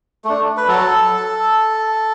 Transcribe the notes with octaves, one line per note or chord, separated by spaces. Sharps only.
A3 D4
B4
F#3 A4